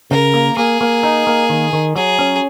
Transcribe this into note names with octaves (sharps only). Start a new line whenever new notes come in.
C#3 A#4
A#3
A#3 G#4
A#3
D#4
A#3
D#3
D#3
F#3 G#4
C#4